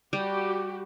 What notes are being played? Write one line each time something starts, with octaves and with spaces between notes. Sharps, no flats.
G3 F#4 G4